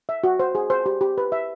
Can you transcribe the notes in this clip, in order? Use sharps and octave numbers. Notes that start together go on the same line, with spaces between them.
E5
F#4
C5
G#4
C5
G4
G4
B4
E5